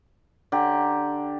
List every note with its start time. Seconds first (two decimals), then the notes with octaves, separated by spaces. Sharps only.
0.52 D3 G4 A#5